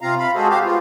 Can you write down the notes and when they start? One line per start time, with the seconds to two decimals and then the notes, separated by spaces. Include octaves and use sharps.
0.01 C3 C4 F4 F5 A#5
0.18 F5 B5
0.35 G#3 F#4 G#4 A4 C5
0.50 G4 C5 F5
0.64 B3 F4